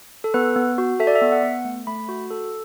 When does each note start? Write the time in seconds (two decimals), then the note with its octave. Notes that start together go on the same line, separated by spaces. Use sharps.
0.24 A4
0.34 B3 B4
0.56 B3
0.78 F#4
1.00 A4 E5
1.07 D5
1.16 E5
1.21 B3
1.32 F#5
1.43 B3
1.65 A3
1.87 A3 B5
2.09 F#4
2.30 A4